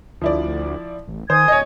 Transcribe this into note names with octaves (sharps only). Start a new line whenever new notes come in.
D2 F3 E4 D5
A1
D#3 C5 G#5 D#6 G#6
D1 C#5 D#5